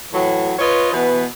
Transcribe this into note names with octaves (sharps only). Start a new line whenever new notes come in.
A2 E3 F#3
F4 B4 C#5 D#5
B2 E3 B3